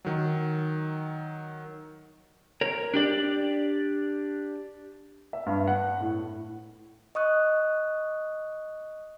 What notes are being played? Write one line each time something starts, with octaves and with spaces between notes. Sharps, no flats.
D#3 F#3
A#4 C#5
D4 G4 D5
E5
G2
F#5
A2
D#5 C#6 D#6 F#6